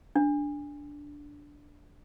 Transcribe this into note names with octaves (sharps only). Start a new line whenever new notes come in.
D4